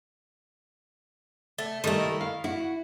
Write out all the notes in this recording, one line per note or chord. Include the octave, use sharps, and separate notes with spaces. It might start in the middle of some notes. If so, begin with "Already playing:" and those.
A3
D#3 G3 A3 E4 D#5
F5
E4 F#4